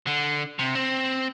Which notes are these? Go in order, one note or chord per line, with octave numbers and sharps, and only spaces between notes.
D3
C3
C4